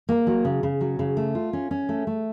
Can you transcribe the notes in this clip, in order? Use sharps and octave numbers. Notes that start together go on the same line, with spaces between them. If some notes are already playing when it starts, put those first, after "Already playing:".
A#3
F#3
C#3
C#3
F#3
C#3
A3
F4
C#4
C#4
A3
A3